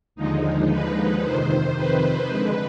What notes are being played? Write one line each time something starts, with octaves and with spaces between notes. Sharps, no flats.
D#2 D3 F3 G#3 D#4
B4
F2 C3 D#3 C5
B4
F2 D3 G#3